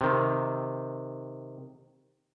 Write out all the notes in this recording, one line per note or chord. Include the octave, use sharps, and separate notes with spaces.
C3 D#3